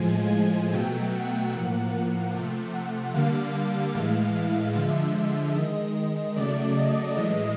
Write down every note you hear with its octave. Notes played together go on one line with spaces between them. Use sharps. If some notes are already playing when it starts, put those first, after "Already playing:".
Already playing: A2 F3 G#3 G#5
B2 F#3 A3 G5
F#5
A2 F3 A#3
C3 F3 A3
F#5
D3 G3 A#3 F5
A2 E3 G#3
D3 F3 G#3 E5
D#3 G#3 D#5
C#3 F#3 A3 D5
D#5
A2 E3 G#3